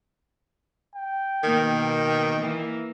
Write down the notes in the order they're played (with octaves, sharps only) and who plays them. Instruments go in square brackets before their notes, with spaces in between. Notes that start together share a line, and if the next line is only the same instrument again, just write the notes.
[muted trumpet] G5
[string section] B2 A#3 [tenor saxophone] D#3
[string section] E3 A#3